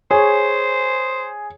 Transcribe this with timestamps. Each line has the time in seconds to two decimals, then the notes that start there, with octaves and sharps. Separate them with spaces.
0.11 G#4 C5 C#5